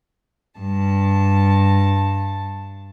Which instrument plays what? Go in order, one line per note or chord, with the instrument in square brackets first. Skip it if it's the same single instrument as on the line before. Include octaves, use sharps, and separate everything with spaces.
[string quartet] G2 A5